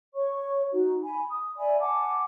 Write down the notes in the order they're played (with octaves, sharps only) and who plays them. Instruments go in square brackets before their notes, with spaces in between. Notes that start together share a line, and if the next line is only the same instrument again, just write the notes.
[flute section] C#5 C#6
D#4 F#4
G#5 B5
D#6
D5 E5 G#5 B5
F#5 G#5 A5 D6